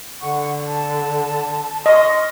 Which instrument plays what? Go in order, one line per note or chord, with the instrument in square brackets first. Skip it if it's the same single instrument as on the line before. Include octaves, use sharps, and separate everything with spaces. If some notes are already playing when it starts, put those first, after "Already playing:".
[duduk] D3 [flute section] F#5 C#6
[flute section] A5
[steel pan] D#5 [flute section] C6 C#6 F6